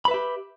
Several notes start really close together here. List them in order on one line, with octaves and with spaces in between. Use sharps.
B5 B4 E5 G4